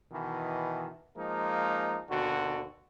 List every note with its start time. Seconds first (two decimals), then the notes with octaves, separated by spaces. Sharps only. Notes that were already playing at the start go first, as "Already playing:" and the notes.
0.11 B2 D#3 E3
1.15 F3 G#3 A#3 D#4
2.08 D#2 B2 D3 F#4